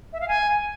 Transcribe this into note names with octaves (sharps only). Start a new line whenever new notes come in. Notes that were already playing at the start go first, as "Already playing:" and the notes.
E5
F5
G#5